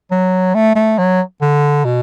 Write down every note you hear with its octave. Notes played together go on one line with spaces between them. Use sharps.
F#3
A3
A3
F#3
D3
B2